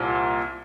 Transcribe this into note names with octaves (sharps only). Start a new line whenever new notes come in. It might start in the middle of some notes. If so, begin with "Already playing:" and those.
Already playing: C2 A#2